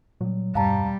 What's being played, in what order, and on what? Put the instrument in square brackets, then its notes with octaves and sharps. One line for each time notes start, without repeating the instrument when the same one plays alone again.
[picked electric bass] A#2 G3 [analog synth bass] F#3
[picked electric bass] D#1 E2 B2 [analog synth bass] G2 [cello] G3 [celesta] F5 A5 A#5